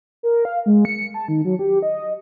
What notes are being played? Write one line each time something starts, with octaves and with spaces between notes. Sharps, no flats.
A#4
F5
G#3
C#7
A5
D#3
F#3
G4
D#5